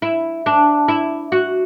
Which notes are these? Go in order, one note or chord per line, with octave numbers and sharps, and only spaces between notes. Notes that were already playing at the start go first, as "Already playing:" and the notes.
E4
D4
E4
F#4